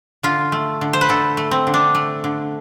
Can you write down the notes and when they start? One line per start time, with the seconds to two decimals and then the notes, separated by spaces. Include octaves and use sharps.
0.23 D3 F4
0.52 A3
0.81 D3
0.93 C5
1.01 B4
1.09 D3 A4
1.37 A3
1.51 C4
1.67 D3
1.74 D4
1.95 A3
2.24 D3